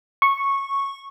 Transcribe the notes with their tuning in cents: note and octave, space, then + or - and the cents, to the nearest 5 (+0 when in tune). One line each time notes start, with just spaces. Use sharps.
C#6 -10